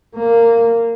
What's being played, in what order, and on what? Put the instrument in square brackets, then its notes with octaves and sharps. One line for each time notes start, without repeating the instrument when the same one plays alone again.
[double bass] A#3